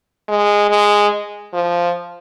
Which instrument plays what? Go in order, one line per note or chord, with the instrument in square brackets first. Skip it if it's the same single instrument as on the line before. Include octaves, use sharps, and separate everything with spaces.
[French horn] G#3
G#3
F3